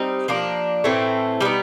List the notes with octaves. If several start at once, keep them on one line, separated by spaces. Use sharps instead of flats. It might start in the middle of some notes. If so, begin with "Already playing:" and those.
Already playing: G3 C4 D#4
F3 A#3 D4
A2 E3 A3 C4
G3 B3 D#4